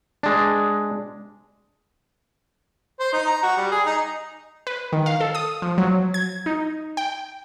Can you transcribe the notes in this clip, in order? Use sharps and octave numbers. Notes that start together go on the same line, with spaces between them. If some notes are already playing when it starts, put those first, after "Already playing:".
G#3 D4
C5
D#4
A#5
F#4
G3
G#4
D#4
B4
D#3
F5
A4
D#6
F3
F#3
G#6
D#4
G5